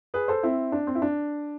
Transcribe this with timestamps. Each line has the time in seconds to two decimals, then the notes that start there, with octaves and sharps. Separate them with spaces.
0.14 G#4 B4
0.28 A4 C5
0.43 C4 E4
0.72 D4
0.87 C4
0.95 E4
1.02 D4